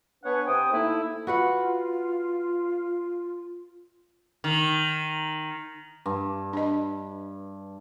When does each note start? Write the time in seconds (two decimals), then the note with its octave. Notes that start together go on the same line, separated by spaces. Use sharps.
0.24 B3 D4 B4 C#5 F#5 G#5
0.47 C3 C5 G5 D#6
0.72 A3 A#3 D#4 E4
1.27 F4 F#4 B4 F#5
4.44 D#3
6.06 G2
6.53 D4 D#5